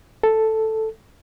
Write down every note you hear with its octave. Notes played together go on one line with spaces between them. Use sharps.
A4